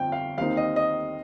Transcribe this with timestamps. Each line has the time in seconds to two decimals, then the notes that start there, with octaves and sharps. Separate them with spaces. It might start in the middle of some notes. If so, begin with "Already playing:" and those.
Already playing: G1 F2 F3 C4 G5
0.12 F5
0.38 D#2 D#3 C4 D#4 F5
0.57 D#5
0.76 D#5